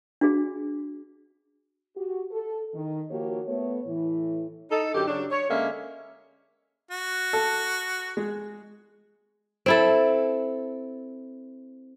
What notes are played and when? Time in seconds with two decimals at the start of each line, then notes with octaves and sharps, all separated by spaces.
0.21 D4 F#4 G#4
1.97 F#4 G4
2.32 A4
2.74 D#3
3.11 D#3 F3 A#3 F#4 G4 C#5
3.47 A3 B3 C#5
3.86 A2 E3
4.71 D#4 A4
4.95 F#2 D3 G4
5.07 C#3 F#3 D4
5.31 C#5
5.50 D3 G#3 A#3 C#4 E5
6.91 F#4
7.33 A4
8.17 G#3
9.66 C4 E4 A4